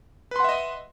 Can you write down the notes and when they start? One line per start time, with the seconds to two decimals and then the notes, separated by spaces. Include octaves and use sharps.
0.31 B4
0.36 C6
0.40 F#5
0.44 E5
0.49 D#5